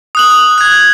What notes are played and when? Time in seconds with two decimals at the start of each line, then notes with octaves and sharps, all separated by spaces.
0.15 D#6 F#6 F#7
0.58 F#6 G#6